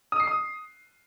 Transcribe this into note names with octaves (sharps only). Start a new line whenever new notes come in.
D#6
C7
D#6